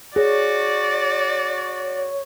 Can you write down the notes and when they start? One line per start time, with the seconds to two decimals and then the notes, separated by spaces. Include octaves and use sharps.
0.16 F#4 G#4 C#5 D5